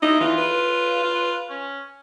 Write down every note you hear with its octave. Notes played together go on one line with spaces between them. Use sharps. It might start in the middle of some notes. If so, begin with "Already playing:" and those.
D#4 E4
E3 F4
B4
F4
C#4